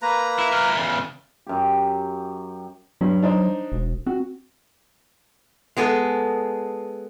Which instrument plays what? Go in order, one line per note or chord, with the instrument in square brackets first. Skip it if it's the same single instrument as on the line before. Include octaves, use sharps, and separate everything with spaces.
[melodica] A#3 B4 A#5
[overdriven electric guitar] E4
E4 A#4
E2 C#3
[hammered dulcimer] F#2 G4
[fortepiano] G2 [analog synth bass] F#3
[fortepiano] D4 D#4 C5
[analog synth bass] E1
[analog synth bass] C4 [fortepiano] F#4
[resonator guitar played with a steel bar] G#3 B3 G#4 A4